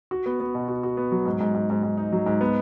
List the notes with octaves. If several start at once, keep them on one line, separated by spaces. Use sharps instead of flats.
F#4
B3
B3
B2
F#4
F#4
B3
F#3
G#2
G#2
G#2
G#2
G#2
D#4
F#3
G#2
B3